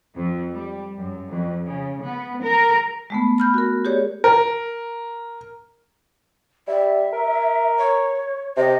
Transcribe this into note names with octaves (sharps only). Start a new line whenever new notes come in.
F2
G3
F#2
F2
C#3
B3
A#4
G#3 A3 B3
B5 F6 G6
F#4 A#4
G4 G#4 C#5 D5
A#4
G3 E5
A#4
C#5
C3 D#5